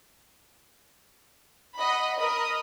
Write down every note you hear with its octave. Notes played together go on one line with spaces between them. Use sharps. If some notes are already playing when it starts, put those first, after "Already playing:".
D#5 F#5 B5
A#4 D#5 B5 D#6